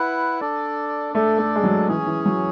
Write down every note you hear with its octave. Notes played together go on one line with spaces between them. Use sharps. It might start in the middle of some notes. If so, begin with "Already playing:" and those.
Already playing: E4 B4 F#5
D4 A4 D5
A3 D4 A4 D5
A3
G#3
F#3
E3 C#4 G#4 C#5
E3
F#3